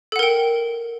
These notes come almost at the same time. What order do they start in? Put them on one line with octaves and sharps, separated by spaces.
A4 F#5 A#4 G5